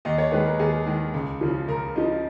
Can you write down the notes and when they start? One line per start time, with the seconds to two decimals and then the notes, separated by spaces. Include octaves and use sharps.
0.05 D#2 D#5
0.18 C#5
0.32 D#3 G#3 B4
0.45 A#4
0.59 D#2 G#4
0.86 D#3 G#3
1.14 C#2
1.41 C#3 F3
1.68 C#2 A#4
1.96 C#3 F3 D#5